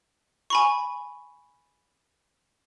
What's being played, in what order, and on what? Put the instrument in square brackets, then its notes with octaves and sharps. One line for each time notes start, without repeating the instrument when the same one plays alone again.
[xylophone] G#5 B5 C#6